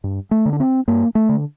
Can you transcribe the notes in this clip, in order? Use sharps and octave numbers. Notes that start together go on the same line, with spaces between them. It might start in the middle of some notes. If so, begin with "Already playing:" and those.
G2
A3
D3
D4
C4
G2 A#3
A3
D3